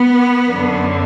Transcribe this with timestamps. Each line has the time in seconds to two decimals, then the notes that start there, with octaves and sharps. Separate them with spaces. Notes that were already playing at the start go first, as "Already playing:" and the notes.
Already playing: B3
0.47 F#2 D3